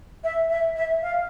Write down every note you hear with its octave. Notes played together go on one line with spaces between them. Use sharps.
E5
E5
E5
F5